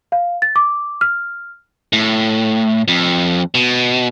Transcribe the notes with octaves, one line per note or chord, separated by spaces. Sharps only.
F5
A6
D6
F6
A2
F2
B2